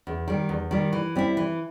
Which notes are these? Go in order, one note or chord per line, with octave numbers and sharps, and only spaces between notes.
E2
D#3 G3
E2
D#3 G3
E3
G3 C4 E4
E3